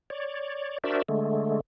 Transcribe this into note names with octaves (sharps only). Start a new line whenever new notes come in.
C#5 D5
D4 F#4 A#4 C5 D5 E5
D3 G#3 A3